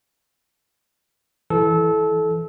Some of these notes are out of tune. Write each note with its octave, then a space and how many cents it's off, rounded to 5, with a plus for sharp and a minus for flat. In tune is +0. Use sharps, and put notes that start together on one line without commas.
E3 +0 A4 -25